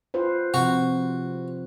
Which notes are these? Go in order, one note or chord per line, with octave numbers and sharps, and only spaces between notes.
F4 B4 C5
C3 F3 F#4